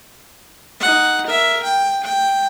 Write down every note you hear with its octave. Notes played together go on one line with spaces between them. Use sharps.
D#4 F#5
A#4 E5
G5
G5